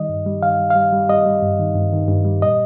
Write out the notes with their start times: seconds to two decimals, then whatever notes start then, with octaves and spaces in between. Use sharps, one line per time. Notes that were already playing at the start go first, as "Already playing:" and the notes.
Already playing: D#3 G3 D#5
0.09 G2
0.26 G3
0.42 D#3 F5
0.60 G3
0.70 F5
0.76 G3
0.93 G3
1.09 G3 D#5
1.26 G3
1.43 G2
1.59 D#3
1.76 G2
1.93 D#3
2.08 G2
2.25 G3
2.42 A#2 D#5